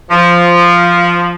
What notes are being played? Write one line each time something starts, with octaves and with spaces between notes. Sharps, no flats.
F3